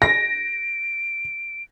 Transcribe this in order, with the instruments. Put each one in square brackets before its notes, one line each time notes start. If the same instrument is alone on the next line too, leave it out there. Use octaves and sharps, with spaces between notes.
[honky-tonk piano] A#6 [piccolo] D7